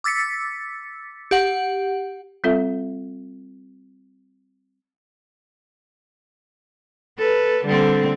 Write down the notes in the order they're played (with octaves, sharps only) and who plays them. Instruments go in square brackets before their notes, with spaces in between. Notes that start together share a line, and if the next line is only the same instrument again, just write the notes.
[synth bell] D6 E6 A6 B6 C#7
G4 F#5
[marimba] G3 C4 F4 A4 E5
[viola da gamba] A4 B4
D3 G3 C4